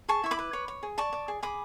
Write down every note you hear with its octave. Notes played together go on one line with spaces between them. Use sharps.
G#4 A5 C#6
E4 C#6
B5 D6
B4
C#5
C#5
G#4
D5 A5 C#6
D5
G#4
G#4 B5 D6